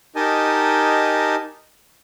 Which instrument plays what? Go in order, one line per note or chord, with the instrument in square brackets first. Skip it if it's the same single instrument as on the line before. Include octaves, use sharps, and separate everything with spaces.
[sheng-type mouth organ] D#4 G4 A#4 D#5 G#5 A5